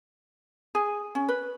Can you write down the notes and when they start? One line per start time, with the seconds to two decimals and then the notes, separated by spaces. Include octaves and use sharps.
0.75 G#4
1.15 C#4
1.28 B4